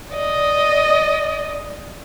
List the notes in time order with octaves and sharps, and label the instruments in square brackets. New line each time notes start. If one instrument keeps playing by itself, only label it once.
[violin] D5 D#5